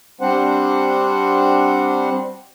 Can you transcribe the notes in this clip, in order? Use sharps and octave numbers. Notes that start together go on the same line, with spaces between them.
G3 C4 D4 C5 F#5